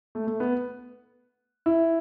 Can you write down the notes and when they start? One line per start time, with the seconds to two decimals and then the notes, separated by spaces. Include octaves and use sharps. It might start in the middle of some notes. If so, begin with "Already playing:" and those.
0.15 A3
0.27 A3
0.40 B3
1.66 E4